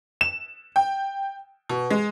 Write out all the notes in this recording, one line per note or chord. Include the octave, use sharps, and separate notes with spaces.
E7
G5
B2
G#3